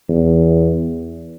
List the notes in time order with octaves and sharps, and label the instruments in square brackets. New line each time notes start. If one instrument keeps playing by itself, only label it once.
[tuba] E2